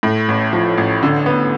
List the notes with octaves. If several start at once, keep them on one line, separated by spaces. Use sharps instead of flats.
A2
A1
F3
A1
D3
B3